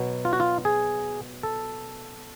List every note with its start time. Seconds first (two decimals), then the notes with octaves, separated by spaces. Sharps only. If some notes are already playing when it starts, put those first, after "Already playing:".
Already playing: B2 F#3 B3
0.25 F4
0.33 F#4
0.40 F4
0.65 G#4
1.43 A4